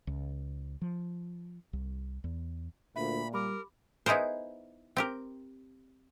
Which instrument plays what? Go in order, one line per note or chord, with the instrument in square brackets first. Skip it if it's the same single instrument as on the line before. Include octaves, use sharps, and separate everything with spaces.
[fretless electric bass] C#2
F3
C2
E2
[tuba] D2 [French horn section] A#2 [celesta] E5 [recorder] B5
[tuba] G3 [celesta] G4 B5 D6 [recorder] A#4
[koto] B3 D#4 E4 G#4 A#4 C5
C4 G4 A#4